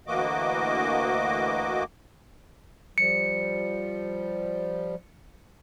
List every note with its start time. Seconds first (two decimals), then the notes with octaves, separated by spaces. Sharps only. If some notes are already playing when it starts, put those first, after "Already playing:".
0.07 D2 E3 A#3 F#4 D#5 D6
2.98 F3 G3 C#7